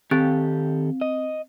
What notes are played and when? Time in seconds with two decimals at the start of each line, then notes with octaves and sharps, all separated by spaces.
0.11 D#3 C4 G4 A4
1.01 D#5